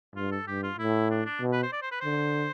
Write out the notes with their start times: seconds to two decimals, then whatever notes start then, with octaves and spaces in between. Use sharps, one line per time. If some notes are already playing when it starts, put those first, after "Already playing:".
0.16 G2 F4
0.31 A4
0.47 G2 G4
0.63 F4
0.78 A2 E4
1.10 D4
1.26 D4
1.41 B2
1.52 B4
1.63 C5
1.73 D5
1.82 C5
1.91 B4
2.00 D3 C5